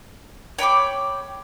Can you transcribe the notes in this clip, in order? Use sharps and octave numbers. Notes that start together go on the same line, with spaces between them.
C#5 G5 B5 D6